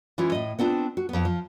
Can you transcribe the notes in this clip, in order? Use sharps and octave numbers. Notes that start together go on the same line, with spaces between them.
E3 G#3 C#4 E4 F4
A2 D#5
B3 C4 D4 F4
F#4
F2 B3
F3